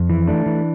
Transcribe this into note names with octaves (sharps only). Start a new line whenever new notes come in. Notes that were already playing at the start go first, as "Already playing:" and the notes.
Already playing: F2
E3
A3 D4
E3